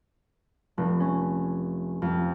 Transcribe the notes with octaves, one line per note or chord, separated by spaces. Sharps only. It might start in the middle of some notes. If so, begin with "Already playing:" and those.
F1
C#4
F2